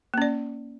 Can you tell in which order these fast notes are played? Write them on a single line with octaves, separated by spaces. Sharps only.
A#3 C#4 D5